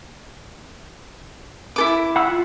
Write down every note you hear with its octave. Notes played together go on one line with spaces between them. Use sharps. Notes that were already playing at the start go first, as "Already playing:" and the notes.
E4 A4 D6
F#5 B5 E6
F4